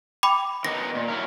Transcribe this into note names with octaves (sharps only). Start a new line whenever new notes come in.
G5 B5 D6
D#3 B3 D#4 A#6
A#2
F#3 E4 A#4